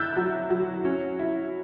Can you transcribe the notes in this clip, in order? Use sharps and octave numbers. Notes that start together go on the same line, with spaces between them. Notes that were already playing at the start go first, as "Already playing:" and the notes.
Already playing: E4 E6 F#6 G6 A6
F#3
F#3
C#4
E4